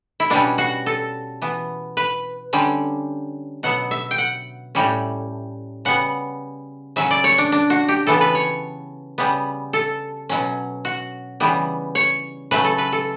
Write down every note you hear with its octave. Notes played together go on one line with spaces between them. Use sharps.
E4
B2 G3 C#4 D4
F#4
A4
E3 B3
B4
D3 G3 C#4
B2 F#3 B3 F#5
E5
G5
F#5
A2 G3 C#4
C#3 G3 B3 F#5
C#3 F#3 C#4 E5
D5
C#5
D4
D4
F#4
G4
C#3 E3 B3 A4
B4
C#5
C#3 G3 B3
A4
B2 F#3 C#4
F#4
C#3 E3 G3 B3
C#5
C#3 F#3 A3 B4
A4
B4
A4